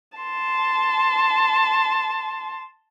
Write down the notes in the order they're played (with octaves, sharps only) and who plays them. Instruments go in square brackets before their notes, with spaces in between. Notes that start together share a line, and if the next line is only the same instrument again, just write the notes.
[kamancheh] A5 C6